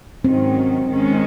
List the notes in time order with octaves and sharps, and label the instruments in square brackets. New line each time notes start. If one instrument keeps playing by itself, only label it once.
[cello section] G#2 D#3 F#3 C#4 [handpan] C4
[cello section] D#3 G#3 C#4